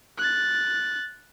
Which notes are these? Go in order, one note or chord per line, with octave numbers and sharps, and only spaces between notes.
F#6 A6